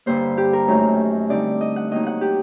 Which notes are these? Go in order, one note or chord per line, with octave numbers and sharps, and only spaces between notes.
G2 D3 G3 A#3 C5
G4
A#4
F#2 D#3 F#3 A3
D3 G3 C4 D#4 D5
D#5
F#5
D#3 F#3 A#3 D#4 D#5
F#5
G4